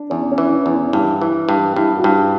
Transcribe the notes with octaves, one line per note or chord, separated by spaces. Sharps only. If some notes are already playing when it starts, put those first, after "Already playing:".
Already playing: D4
E2 C#4
C#4
E3
E4
E2
G2 E4
E3
G2
G2 E4
E4
F#4
G2